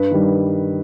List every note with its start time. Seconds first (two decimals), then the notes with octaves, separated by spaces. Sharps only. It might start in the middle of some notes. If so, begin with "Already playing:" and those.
Already playing: G2 B4
0.11 D#3 G3